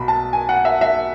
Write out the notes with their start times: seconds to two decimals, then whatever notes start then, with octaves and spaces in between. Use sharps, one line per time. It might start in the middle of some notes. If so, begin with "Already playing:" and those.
Already playing: B1 B5
0.08 A5
0.33 G#5
0.49 F#5
0.65 E5
0.81 E5